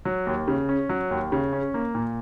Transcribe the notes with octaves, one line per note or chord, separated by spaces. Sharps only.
F#3
D#2
C#3
C#4
F#3
D#2
C#3
C#4
A#3
A#2